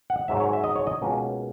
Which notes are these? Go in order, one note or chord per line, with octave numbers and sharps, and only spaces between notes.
F#5
G#2 F#3 C#4 E5
C#5
E5
D#5
C#5
D#5
C#2 B2 A#3 C#4